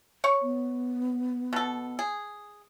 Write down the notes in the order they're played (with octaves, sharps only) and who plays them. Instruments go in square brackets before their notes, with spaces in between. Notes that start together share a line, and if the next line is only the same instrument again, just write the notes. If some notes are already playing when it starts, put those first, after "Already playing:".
[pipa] C#5 C#6
[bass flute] B3
[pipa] B2 A4
G#4